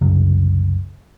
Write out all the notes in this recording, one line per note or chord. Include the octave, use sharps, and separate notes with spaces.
C2 F#2 C#3 F#3